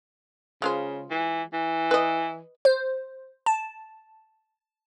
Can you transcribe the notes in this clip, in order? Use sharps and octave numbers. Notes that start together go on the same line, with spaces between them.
C#3 G#3 F4 C5
E3
E3
B4 D#5
C5
A5